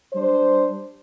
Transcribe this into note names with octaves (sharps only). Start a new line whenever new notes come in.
G3 D4 C5